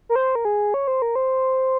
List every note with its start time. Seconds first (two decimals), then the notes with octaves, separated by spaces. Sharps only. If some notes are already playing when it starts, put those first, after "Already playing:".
0.09 A#4
0.16 C5
0.35 A#4
0.45 G#4
0.74 C#5
0.88 C5
1.02 A#4
1.15 C5